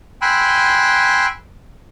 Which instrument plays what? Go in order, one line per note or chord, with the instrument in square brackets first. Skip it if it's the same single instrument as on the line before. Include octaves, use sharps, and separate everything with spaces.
[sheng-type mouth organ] G5 G#5 B5 C6 E6 F#6